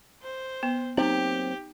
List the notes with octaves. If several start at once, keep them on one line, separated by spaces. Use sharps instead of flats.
C5
B3
F#3 A#3 C4 D#4 G4